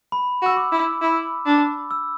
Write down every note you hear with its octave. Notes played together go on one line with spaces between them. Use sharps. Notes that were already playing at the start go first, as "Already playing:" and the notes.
B5
F#4
E6
D6
E4
E4
D4
E6